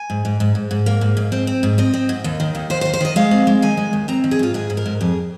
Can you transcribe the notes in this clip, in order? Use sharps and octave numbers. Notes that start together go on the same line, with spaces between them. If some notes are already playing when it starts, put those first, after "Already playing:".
Already playing: G#5
G#2
G#2
G#2
G#2
G#2
A#3
G#2
G#2
C4
C4
G#2
C4 D#5
C4
G#2
D#2
D#3
D#2
D#2 C5
C5
D#3
C5
D#3 D#5
G#3 F5
C4
G#3
D#3 G#5
G#3
D#2
C4 A#5
D#3
G#4
G#2 F4
G#2 G#4
G#2
A#4
G#2
F2 G#4